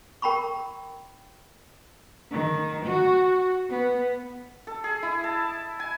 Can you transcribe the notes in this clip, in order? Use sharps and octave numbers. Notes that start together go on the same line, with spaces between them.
A#4 G5 A#5 B5 C#6
D#3
F#4
B3
A4
G#4
E4
A5
G#5